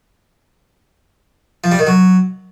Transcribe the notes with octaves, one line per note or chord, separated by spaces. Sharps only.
F3
G3
D#3
F#3